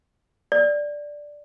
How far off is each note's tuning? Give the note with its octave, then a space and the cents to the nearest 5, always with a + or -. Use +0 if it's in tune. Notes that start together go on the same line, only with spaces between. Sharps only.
D5 +0